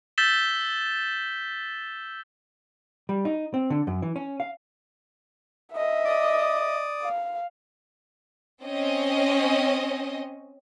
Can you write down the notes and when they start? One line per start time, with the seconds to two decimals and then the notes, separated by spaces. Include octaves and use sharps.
0.18 E6 G6 A6 B6 E7 G7
3.09 G3
3.25 D#4
3.54 C4
3.70 D3
3.87 F#2
4.02 E3
4.16 C#4
4.40 F5
5.74 D#5 E5
6.05 D5 D6 D#6
7.04 F5
8.62 C4 C#4 D#5